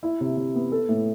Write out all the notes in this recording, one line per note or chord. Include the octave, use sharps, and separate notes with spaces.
E4
C3
C3
B3
A4
A2